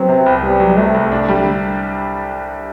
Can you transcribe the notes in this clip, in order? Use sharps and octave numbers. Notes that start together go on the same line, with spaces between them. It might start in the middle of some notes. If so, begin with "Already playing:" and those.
Already playing: F#3 B3 C4
C3
C2
G3 B3
F#3
C3 A3
C2
D4
G3
D3